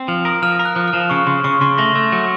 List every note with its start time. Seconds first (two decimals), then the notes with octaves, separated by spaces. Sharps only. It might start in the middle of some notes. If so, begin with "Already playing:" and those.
Already playing: C4
0.08 F3 F6
0.25 A#4 D#6
0.42 F3 F6
0.59 A#4
0.65 F#6
0.76 F3
0.88 F6
0.93 F3
1.10 C#3 C#6
1.27 C#3 C6
1.44 C#3 C#6
1.61 C#3 C6
1.78 A3 A#6
1.95 A3
2.12 F#3